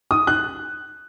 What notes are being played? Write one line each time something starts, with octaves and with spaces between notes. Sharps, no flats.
D#6
F#6